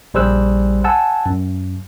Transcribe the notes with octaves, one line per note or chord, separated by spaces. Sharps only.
A#1 G3 G#4 C5 E6 F#6
F#5 G#5 A5 E6
F#2